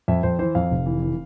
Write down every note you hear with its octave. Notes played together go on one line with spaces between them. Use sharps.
F2 E5
F2 C5
E3 C5
F2 F5
F1
E3
E3